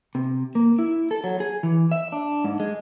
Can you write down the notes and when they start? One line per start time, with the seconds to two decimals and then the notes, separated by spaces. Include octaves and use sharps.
0.15 C3
0.55 A#3
0.79 E4
1.11 A4
1.24 F#3
1.40 G#4
1.63 E3
1.91 E5
2.12 D4
2.44 G#2
2.60 G#3